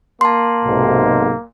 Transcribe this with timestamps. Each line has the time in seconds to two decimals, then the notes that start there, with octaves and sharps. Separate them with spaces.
0.21 A#3 A5 C6
0.65 B1 G#2 C3